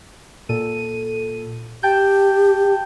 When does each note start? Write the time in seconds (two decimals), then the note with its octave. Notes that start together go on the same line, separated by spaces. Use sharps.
0.49 A#2 A4 D#7
1.83 G4 G5 A5 G6